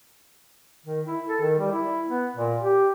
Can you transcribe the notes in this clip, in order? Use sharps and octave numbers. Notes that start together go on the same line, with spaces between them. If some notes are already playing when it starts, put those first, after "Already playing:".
D#3
E4
A4
D#3
G3
E4
B3
A#2
G4